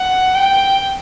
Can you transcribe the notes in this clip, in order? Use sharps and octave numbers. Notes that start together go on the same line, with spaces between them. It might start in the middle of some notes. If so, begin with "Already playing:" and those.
Already playing: F#5
G5